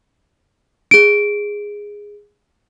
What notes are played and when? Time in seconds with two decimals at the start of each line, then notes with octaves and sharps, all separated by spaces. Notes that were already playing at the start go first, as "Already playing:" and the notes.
0.91 G#4 D7